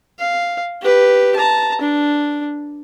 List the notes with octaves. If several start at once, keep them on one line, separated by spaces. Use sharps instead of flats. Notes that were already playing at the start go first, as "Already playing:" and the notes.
F5
G4 B4
A5 A#5
D4